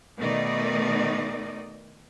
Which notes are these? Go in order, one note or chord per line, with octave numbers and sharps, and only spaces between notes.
B2 D#3 A3 D#4 D5 D#5